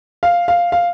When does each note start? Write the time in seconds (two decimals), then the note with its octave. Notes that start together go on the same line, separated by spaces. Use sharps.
0.23 F5
0.48 F5
0.72 F5